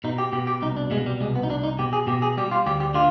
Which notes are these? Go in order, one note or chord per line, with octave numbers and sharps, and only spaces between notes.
B2 D#4
G4
B2 G4
G4
C2 D#4
D4
B2 G#3
G3
C2 G#3
B3
D#4
C2 D4
D#4
B2 G4
G#4
B2 G4
G#4
G3 G4
F4
D2 G4
G4
D3 F4